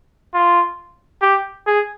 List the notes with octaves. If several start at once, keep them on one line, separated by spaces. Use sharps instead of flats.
F4
G4
G#4